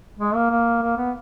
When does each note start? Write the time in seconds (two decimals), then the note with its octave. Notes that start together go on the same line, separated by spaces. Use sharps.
0.19 G#3
0.35 A#3
0.50 A#3
0.82 A#3
0.97 B3